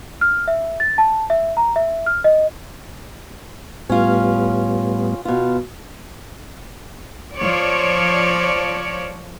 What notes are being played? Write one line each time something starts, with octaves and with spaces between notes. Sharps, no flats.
F6
E5
A6
A5
E5
A#5
E5
F6
D#5
A2 G3 B3 C#4 F4
B2 F4
F3 C#5 D5